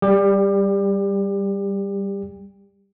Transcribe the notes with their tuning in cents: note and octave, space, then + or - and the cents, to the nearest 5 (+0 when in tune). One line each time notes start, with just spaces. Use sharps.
G3 +0 G4 +30